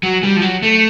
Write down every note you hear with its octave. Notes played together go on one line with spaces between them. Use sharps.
F#3
G3
F3
F#3
A3